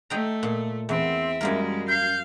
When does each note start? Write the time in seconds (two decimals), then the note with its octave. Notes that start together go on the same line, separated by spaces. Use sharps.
0.10 A3 D#5 G5 A#5
0.43 A#2
0.89 E2 C4 E5
1.41 F#2 G3 G#3 A#3 A#4
1.88 F5 G6